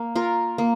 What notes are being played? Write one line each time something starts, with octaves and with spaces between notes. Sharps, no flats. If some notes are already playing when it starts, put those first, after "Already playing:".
Already playing: A#3
F4 A#4
A#3